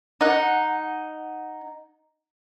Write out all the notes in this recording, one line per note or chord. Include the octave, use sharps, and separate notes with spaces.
D#4 F#5